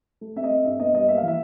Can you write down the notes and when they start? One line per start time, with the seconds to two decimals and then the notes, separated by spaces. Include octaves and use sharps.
0.21 A3
0.36 C4 E5
0.44 D#5
0.51 A3
0.65 G2 E5
0.80 B3 D#5
0.94 G3 D#5
1.08 A#3 E5
1.18 F5
1.22 E3
1.28 E5